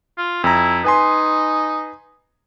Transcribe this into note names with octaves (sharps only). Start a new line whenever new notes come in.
F4
F2 E4 A#5
D#4 B4 G#5 C6